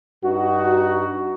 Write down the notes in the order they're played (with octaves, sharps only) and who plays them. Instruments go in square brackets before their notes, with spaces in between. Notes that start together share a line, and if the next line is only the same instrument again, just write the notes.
[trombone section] G2 D#4 F#4